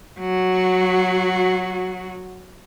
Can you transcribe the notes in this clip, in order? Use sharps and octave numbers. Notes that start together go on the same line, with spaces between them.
F#3 F#4